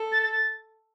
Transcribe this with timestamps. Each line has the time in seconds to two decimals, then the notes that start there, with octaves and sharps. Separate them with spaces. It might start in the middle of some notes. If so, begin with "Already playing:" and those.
Already playing: A4
0.12 A6
0.22 A6
0.33 A6